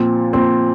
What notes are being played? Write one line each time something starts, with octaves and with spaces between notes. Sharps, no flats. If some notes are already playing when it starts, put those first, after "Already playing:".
Already playing: A#2 F3 C4
A#2 F3 C4